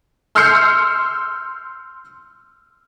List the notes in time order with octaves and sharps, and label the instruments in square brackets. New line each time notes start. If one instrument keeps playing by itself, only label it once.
[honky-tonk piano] C6 E6 F6 G6 C7 C#7